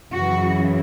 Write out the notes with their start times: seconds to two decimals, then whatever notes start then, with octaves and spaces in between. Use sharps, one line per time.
0.12 F#2 C#3 E3 F#4